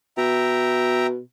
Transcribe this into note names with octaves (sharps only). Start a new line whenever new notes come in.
B2 E5 G5 A#5